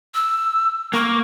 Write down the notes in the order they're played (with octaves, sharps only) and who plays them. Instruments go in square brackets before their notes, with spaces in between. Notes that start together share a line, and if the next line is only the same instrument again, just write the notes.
[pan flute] E6
[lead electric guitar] A#3 [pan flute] C#6